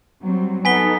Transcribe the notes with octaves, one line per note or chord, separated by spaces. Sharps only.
F#3 G3 C4
B3 D#4 A4 G#5 B6 G7